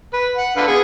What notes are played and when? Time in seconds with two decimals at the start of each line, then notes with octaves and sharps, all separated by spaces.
0.13 B4
0.36 F#5
0.56 D3 B4 F5
0.68 B3 G#4